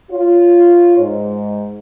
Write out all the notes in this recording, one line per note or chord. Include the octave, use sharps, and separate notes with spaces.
F4 C#5
G#2